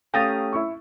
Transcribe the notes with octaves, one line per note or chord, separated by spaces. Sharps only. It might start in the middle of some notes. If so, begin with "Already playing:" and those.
A3 C#4 G4 F5 A#5 D#6 A6
E4 C#6